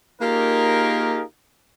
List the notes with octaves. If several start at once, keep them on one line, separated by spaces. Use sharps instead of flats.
A#3 D#4 F4 G4 G#4 A#4